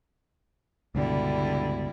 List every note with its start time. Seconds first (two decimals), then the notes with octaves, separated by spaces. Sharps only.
0.95 C#2 G2 B2 D3 G3 E4